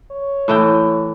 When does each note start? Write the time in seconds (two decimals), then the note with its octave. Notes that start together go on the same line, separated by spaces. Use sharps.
0.11 C#5
0.48 A2 E3 G5